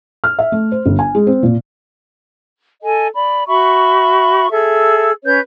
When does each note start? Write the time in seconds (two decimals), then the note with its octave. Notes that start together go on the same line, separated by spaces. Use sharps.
0.24 F6
0.39 E5
0.52 A3
0.72 C5
0.86 G1
0.99 G#5
1.15 G#3
1.27 C4
1.43 A#2
2.82 A4 D#5 G#5
3.15 D5 B5
3.48 F#4 E5 B5 C#6
4.50 G#4 A4 E5 E6
5.24 C#4 B4 C#5 G6